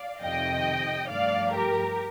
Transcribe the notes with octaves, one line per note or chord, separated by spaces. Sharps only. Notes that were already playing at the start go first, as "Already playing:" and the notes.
Already playing: D5 F5
F2 C3 D#3 D#5 G5
G2 F3 A3 D5 F5
G4 A#4